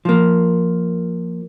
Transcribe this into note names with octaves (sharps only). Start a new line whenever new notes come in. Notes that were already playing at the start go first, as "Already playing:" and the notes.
F3 A#3